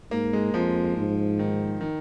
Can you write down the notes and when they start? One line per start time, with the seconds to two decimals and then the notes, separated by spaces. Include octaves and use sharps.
0.11 G#2 A#3
0.33 G#3
0.54 F2 F3
0.96 G#2
1.39 D#3
1.81 D#3